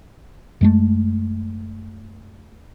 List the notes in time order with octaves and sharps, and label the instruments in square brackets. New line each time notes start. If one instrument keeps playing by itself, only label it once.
[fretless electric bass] F#2 G#3 A3